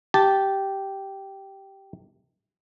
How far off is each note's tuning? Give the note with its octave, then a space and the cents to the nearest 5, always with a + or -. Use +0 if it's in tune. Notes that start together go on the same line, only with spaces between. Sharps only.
G4 -10 A5 -5